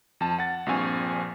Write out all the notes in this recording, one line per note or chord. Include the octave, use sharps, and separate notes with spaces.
F2 A5
F#5 A6
A#1 G2 F3 C4 G#5 C#6